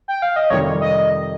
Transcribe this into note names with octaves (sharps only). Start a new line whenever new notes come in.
G5
F5
D#5
F2 C3 D#3 G3 C#5
D#5